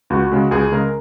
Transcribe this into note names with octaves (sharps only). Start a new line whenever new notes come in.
C#2 F#4
C#3 G#3
C#2 G#4
C#3 G#3 A#4